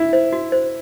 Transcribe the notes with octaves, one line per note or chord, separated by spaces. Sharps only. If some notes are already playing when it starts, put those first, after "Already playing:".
Already playing: E4
C5
F#4
C5